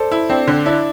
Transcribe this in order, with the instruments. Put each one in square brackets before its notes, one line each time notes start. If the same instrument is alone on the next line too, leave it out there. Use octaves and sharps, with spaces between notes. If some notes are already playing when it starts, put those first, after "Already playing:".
Already playing: [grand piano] A4 C5 D5
[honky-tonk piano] E4
[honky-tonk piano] C4 [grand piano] D4
[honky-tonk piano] D3 [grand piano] D4
[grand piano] D4 [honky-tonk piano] E4